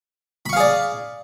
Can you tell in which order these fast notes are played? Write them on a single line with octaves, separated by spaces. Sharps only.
B5 C#6 F5 G#4 D5